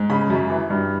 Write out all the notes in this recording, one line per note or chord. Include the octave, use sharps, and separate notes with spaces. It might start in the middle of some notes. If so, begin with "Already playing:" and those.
Already playing: G#2
C#3 B5
F#2
E3
G2